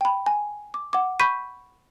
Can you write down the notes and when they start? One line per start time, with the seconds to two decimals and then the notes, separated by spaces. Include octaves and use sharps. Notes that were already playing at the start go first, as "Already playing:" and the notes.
0.01 G5 B5
0.26 G#5
0.74 D6
0.93 F#5 D6
1.20 B5 C#6 G6 B6 D#7